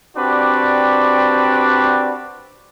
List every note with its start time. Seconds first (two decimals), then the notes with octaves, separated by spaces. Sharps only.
0.17 C4 D4 F#4 G4 B4 D5